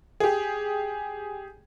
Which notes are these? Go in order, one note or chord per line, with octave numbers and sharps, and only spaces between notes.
G4 G#4